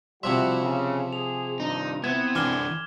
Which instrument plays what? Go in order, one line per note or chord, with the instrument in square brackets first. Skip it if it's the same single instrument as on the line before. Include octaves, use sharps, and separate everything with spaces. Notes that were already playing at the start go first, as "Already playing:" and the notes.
[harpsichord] C3 F3 E5 [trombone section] G3 E4 F#4 [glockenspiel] C6
[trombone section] C#3
[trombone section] G#4 [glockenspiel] F7
[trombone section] G2 D#3 D4 [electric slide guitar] D#4
[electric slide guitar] B3 [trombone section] C4 E4 [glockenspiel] G#6 E7
[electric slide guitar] E3 D4 [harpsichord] G#5 [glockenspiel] D6 F6 G7